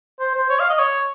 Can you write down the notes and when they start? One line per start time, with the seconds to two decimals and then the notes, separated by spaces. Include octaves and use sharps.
0.20 C5
0.35 C5
0.50 C#5
0.60 F5
0.69 D#5
0.79 C#5